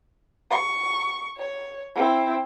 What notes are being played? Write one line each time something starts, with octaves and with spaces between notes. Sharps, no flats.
C#6
C#5
C4 E4